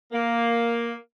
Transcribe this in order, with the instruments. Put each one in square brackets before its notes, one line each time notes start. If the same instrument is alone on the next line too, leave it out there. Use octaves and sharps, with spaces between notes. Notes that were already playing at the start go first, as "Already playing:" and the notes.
[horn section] A#3